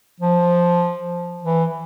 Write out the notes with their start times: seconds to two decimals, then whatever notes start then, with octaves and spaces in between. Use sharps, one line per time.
0.20 F3
1.43 E3